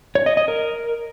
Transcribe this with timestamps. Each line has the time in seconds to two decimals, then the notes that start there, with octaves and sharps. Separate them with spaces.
0.15 C#5
0.26 D#5
0.37 D#5
0.48 A#4